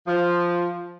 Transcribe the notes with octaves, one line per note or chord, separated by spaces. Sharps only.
F3